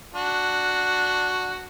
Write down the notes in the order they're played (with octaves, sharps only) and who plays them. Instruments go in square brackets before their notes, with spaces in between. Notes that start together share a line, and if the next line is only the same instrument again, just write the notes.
[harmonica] D4 F#4